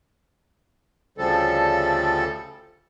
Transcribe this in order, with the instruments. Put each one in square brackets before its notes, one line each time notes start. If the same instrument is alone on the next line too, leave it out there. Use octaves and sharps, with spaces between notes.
[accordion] D2 C#3 F3 G3 A4